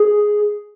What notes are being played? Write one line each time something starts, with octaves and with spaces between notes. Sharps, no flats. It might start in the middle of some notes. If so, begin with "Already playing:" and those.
Already playing: G#4